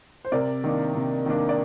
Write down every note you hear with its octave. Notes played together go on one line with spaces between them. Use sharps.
C5
C3 A#4 D5
D#3 A#3 D4
C3
D#3 A#3 D4
D5